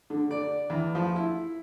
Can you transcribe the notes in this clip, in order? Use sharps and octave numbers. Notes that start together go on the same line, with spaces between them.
D3
D5
E2
F3
E4